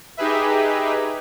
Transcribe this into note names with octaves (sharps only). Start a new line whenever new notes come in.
D#4 G4 G#4 B4 E5